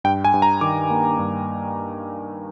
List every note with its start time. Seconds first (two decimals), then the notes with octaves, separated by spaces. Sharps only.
0.04 G2 G5
0.25 G#5
0.34 G2
0.42 A#5
0.61 D#3 D6
0.90 A#3
1.19 G2